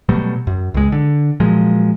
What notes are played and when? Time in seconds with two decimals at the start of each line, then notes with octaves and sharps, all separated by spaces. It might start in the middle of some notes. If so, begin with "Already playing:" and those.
0.09 B2 F#3 G3 A3
0.47 F#2
0.74 C#2 G#3
0.92 D3
1.40 A#2 F3 F#3 G#3